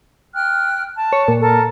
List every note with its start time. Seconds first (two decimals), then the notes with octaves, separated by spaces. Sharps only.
0.34 G5 F6 F#6
0.96 A5
1.13 C#5
1.28 A#2
1.41 A4 A#4 A5